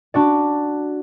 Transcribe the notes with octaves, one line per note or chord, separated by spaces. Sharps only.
D4 F#4 D5